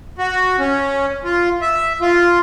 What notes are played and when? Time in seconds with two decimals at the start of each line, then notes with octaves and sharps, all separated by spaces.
0.18 F#4
0.59 C#4
1.24 F4
1.62 E5
2.01 F4